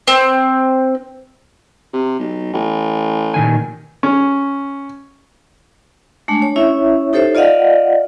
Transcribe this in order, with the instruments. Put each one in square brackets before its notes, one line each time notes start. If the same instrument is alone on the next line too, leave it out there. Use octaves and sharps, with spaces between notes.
[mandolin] C4
[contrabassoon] C3
B1
A1
[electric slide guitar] A#2 D#3 G#5
[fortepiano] C#4
[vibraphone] G#3 A3 D4
C#5
C#4 E4 C#5 E5
D#4 G4 A4 C5 C#5 E5
F4 D5 D#5 F5 F#5